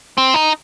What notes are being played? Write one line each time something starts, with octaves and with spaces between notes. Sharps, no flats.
C4
D#4